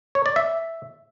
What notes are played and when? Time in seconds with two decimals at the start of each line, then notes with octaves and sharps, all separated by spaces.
0.15 C#5
0.26 D5
0.36 E5